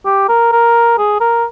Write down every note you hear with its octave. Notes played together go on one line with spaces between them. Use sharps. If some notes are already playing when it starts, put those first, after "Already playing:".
G4
A#4
A#4
G#4
A#4